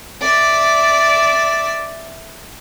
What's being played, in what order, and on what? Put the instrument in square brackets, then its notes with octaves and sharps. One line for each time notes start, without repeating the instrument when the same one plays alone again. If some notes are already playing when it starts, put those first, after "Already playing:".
[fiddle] D5 E5